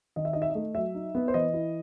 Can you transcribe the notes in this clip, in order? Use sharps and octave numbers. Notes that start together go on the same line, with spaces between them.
D#3 D#5
E5
D#4 D#5
E5
D#5
A3
F#3 E5
D#4
B3
C5
E3 D#5
E4